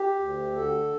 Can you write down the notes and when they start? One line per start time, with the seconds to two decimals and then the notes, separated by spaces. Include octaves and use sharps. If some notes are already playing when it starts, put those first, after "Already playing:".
Already playing: G4
0.19 D2
0.52 D3 A4